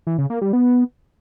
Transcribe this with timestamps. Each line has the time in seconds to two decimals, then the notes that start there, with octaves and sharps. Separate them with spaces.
0.07 E3
0.18 C#3
0.30 A#3
0.41 G3
0.53 B3